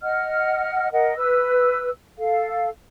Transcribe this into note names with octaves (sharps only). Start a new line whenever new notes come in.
D#5 F#5 F6
A#4 D#5 F#5
B4 E6
A4 F5